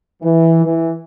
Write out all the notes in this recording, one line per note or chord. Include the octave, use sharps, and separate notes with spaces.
E3
E3